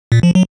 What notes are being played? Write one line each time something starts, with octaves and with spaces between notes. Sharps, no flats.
A#2
F3
F#3